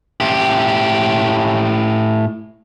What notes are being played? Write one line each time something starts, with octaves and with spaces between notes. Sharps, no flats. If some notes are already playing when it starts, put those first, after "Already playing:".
A2 G4